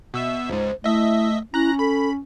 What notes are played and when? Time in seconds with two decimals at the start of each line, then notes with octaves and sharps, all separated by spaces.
0.14 B2 E5 E6
0.49 C#2 G#2 C5
0.84 A3 E4 D#5 E5
1.54 C#4 E4 A#5 F#6 A#6
1.79 A4 B5